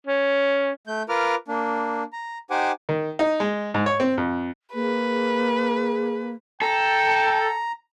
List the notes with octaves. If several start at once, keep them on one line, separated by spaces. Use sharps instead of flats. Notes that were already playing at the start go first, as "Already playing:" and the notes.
C#4
A3 G6
F4 A#4 B4 D6 F6
A#3 D4
A#5
D#4 G4 C5 F#5 G#5 D6
D#3
D#4
G#3
G#2
C#5
C4
F2
A#3 G#4 B4
A4 G5 A#5